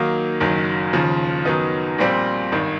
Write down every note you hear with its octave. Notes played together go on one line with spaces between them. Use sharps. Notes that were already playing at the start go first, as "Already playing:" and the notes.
Already playing: D#3 F#3 A#3 D#4
F#1 F#2 D#3 F#3
D#2 C#3 F3
F#2 D#3 F#3 B3 D#4
A#1 A#2 G3 C4
G#1 G2 D#3